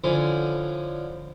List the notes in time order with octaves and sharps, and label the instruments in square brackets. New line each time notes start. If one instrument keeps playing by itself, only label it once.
[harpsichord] D3 F3 C#4 E4